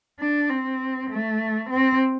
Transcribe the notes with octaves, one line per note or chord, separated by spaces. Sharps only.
D4
C4
A3
C4